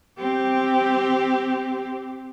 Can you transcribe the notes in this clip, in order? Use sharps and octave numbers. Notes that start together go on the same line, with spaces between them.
C4 G4